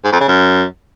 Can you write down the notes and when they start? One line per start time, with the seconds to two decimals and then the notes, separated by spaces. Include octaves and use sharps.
0.04 G#2
0.12 F2
0.20 C#3
0.28 F#2